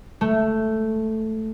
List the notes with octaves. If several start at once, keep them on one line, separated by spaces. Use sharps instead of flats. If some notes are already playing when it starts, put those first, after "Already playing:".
A3